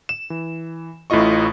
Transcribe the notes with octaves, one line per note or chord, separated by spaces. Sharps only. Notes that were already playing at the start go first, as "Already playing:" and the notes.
E7
E3
A1 A2 E4 F4 D#5 C#6